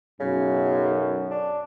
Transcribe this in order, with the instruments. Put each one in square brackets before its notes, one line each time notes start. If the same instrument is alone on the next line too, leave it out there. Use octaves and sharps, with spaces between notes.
[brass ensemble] B1 F#2 [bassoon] C#3
[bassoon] D4